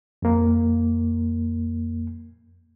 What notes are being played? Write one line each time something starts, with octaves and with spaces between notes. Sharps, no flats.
F2 A#3